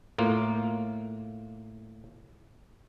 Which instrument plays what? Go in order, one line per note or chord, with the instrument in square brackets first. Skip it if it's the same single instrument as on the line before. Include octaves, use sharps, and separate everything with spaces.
[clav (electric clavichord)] A2 A#3 F4